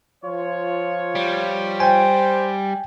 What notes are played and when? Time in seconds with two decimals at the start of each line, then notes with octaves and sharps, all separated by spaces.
0.24 F3 F4 C#5
1.15 G3
1.80 C5 G5 G#5